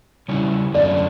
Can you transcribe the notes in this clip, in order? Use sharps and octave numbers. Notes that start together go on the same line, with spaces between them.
C#3 G3 C#4 E4
F#2 D3 A3 C#4 D5